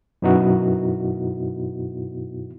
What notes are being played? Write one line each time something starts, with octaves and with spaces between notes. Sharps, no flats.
F#2 B2 B3 D#4 E4 F#4